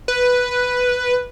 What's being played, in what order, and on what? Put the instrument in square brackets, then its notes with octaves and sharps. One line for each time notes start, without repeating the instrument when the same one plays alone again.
[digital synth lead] B4